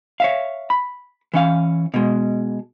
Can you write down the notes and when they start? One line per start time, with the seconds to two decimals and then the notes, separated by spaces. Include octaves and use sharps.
0.20 C#5 E5 F5
0.70 B5
1.33 E3 C#4 F5
1.94 B2 G#3